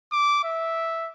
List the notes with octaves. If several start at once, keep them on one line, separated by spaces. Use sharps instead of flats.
D6
E5